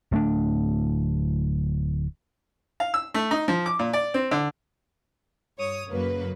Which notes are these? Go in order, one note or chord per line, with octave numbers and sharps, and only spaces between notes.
D1 A3 D4
F5
E6
A3
D#4
F3
D6
A#2
D5
C4
D3
G2 C#5 D#6
F#2 C#3 F#3 A#3 B4